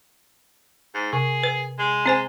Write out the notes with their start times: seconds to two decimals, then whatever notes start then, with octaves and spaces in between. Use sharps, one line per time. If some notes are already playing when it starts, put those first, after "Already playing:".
0.94 G#2
1.13 C3 G#4
1.43 B4
1.79 G#3
2.06 C4 C5 G#5